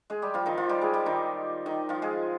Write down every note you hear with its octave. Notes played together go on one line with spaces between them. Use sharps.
G#3 G#4
G3 G4
F3 F4
D#3 D#4
F3 F4
G3 G4
G#3 G#4
G3 G4
D#3 D#4
D#3 D#4
F3 F4
G#3 G#4